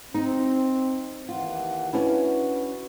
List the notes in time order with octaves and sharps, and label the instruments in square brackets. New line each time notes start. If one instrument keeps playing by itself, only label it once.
[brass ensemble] C4 [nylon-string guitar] D#4
[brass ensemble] D#2 E3 F#5 [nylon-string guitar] F4
[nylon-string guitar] C#4 D4 E4 [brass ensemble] F#4 B4